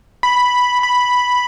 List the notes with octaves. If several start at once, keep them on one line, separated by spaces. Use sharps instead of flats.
B5
B5